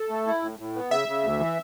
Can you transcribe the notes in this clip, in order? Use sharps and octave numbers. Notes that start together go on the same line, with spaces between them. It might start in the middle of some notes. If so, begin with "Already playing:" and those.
Already playing: A4
A3
E4
A2
A2
B3
C#3 E5
C#3
D2
E3